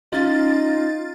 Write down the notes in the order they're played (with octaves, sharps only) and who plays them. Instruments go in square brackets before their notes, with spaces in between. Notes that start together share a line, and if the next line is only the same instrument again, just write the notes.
[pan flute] C#4 [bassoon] D#4 [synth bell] F4 A6